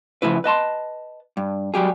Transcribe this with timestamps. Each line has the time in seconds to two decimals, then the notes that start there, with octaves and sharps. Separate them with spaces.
0.22 C#3 F3 A3 E4 B4
0.44 B4 D#5 A5 C6
1.37 G2
1.74 F#3 G3 G4 G#4